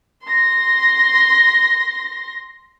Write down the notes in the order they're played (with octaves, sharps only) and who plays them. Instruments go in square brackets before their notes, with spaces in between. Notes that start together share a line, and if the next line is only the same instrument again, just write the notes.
[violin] C6 A#6